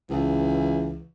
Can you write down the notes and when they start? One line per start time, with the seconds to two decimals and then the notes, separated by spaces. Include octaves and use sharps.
0.10 C#2 E3